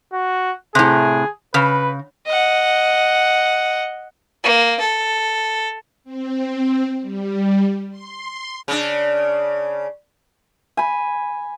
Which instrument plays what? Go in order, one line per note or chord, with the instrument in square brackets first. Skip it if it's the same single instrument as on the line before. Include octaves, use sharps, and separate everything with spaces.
[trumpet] F#4
[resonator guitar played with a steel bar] A2 C3 [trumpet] G#4
[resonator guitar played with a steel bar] C#3 [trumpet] B4
[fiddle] D#5 F#5
A#3
A4
[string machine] C4
G3
C6
[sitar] C#3 D4
[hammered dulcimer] G#5 B5